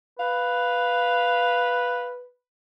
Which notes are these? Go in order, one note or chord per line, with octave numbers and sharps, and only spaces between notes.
B4 F5